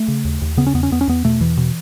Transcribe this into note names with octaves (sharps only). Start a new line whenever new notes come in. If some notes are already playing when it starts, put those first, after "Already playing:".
Already playing: A3
C#3
D#2
D#2
C#3 B3
C#4
E2 B3
C#4
E2 B3
C#4
E2 B3
B2 A3
E2 E3
B2